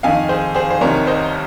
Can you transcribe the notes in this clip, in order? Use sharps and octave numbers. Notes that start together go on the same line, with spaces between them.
F2 D#3 F5 G#5
G#4 C5
G#4 C5
C5
C2 C3 D#3 A#4 C#5
C5 D#5